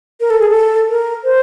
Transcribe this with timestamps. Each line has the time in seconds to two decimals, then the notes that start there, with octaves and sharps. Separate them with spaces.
0.21 A#4
0.30 A4
0.40 G#4
0.49 A4
0.90 A#4
1.24 C5